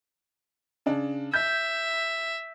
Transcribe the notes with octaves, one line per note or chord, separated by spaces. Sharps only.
C#3 D4
E5 G6